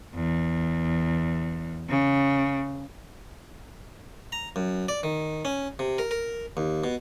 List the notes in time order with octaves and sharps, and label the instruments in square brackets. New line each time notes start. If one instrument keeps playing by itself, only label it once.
[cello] E2
C#3
[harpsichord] A#5
F#2
D5
D#3
C#4
C3
A#4
A#4
D#2
B2